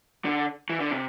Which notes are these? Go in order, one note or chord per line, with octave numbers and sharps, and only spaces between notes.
D3
E3
D3
C3